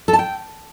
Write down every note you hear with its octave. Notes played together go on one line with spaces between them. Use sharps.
A4
A5
G5